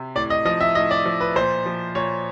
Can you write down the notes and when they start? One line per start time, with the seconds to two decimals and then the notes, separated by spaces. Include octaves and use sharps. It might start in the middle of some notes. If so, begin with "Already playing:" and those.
Already playing: C3
0.15 A2 D5
0.30 D#5
0.45 F3 D#5
0.61 E5
0.75 A2 D#5
0.91 D5
1.05 F3
1.21 B4
1.36 A#2 C5
1.66 F3
1.95 A#2 C#5